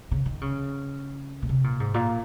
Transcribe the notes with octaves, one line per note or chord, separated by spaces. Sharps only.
C#3
D#3
C#3
A#2
C3
A#2
G#2
A#2